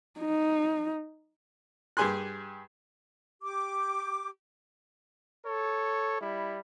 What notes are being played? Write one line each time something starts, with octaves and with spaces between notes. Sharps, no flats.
D#4
G2 G4 G#4 G#5 C6 F#6
G4 D6
A4 C#5
G3 E4